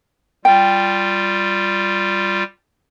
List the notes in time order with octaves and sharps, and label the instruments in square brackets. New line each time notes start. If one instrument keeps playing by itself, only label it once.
[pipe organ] G3 F4 [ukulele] G5